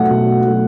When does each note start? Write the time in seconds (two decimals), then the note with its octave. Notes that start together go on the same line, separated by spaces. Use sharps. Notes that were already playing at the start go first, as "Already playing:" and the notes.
Already playing: B2 F#3 A3 F#5
0.10 B2
0.46 F#3 A3